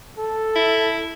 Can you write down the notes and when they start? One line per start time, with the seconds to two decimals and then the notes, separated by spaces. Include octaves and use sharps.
0.19 A4
0.56 E4